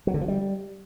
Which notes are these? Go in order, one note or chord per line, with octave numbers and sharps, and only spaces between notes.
F#3
D3
F3
G3